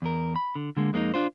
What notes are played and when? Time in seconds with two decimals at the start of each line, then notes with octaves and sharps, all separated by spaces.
0.02 E2 A#4
0.36 B5
0.55 D3
0.77 D3 G#3 A#3
0.93 F2 G#3 A#3 C#4 D#4
1.14 D4 F4 C5